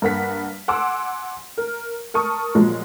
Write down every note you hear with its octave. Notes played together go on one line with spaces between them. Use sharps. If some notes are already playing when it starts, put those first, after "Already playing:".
G2 A#3 F#5 B6
F#5 G#5 C6 D6 E6
A#4
A#4 A5 C#6 D#6
A#2 F3 F#3 G#3